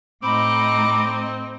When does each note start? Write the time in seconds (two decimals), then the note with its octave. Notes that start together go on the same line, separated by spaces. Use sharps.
0.23 A2 C4 D#4 D#5 B5 D6